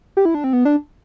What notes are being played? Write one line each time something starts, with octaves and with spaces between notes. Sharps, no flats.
G4
E4
D4
C4
B3
D4